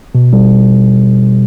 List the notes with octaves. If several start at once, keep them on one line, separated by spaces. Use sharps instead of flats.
B2
G3